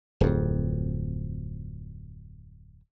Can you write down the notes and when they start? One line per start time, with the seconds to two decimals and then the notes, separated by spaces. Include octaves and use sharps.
0.21 D1 F2